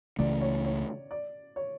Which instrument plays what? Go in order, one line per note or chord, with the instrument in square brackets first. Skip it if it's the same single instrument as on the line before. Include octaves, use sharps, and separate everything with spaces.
[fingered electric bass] C#2 C#3 E3 A3 [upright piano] D5
[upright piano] C#5
C#5
D5
C#5